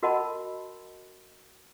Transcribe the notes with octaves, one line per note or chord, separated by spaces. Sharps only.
F#4 A#4 D#5 F#5 A5 B5